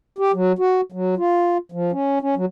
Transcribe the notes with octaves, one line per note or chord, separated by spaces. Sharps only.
G4
F#3
F#4
F#3
F4
F3
C#4
C#4
F#3